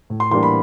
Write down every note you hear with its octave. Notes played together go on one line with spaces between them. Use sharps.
A2
C6
E3 G3 A#3 D4 C6
B5